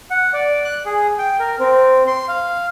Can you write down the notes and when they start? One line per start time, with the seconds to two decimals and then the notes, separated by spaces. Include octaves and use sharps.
0.10 F#5
0.33 D5
0.64 F#6
0.86 G#4
1.18 G5
1.39 A#4
1.59 C4
2.07 C6
2.28 F5